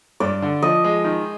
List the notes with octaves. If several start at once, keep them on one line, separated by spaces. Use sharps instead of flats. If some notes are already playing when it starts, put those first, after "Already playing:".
G2 D5
D3
F3 D#5
G#3
D#3